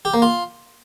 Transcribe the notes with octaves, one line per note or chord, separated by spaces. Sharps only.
G4
A#3
F4